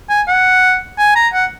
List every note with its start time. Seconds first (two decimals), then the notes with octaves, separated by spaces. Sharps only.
0.09 G#5
0.28 F#5
0.98 G#5
1.16 A#5
1.33 F#5